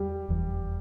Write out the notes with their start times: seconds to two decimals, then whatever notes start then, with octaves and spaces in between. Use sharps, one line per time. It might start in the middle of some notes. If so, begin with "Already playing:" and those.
Already playing: E2 G3
0.29 F1 E2 E3